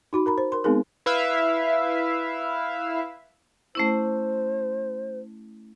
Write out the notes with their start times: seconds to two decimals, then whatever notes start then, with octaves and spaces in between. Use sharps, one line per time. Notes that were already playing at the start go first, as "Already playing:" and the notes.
0.13 D#4 F#4 B5
0.26 A#4 A#5 B5
0.38 C5
0.52 A#4 C6
0.64 G#3 B3 C4 D#4 G#4 A#4
1.06 E4 B4 E5 F5
3.75 A3 C#4 E4 C5